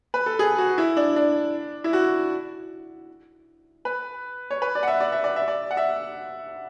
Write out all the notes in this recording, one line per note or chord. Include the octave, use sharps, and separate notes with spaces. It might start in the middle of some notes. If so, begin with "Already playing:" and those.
B4
A4
G#4
F#4
E4
D4
D4
E4
F#4
B4
C#5
B4
D5
F#5
E5
D5
E5
D5
E5
D5
F#5
E5